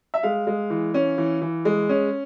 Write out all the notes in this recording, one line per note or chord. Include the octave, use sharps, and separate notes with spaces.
E5
G#3 F5
G#3
E3
C#4
E3
E3
G#3
C#4